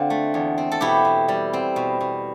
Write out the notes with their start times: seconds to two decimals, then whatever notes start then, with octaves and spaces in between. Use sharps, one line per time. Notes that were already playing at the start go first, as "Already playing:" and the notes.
Already playing: D3 C4 F4
0.10 A3
0.34 E2
0.58 C4
0.72 A4
0.81 B2 E4 G4
1.05 B2
1.28 G3
1.53 C4
1.76 B2
2.01 B2